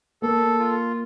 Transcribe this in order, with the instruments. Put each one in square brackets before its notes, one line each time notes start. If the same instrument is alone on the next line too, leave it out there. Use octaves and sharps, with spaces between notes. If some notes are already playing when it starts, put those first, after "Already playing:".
[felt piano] A#3 [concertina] A4
[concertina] F4